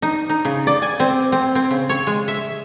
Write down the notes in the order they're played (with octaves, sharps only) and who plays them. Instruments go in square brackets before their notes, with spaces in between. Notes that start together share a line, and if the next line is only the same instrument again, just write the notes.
[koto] D#4
D#4
C#3
D5
G#5
C4
C4
C4
C#3
C#5
G#3
E5